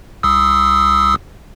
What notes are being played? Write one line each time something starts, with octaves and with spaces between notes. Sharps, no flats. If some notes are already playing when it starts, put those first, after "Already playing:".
C2 D#6 E6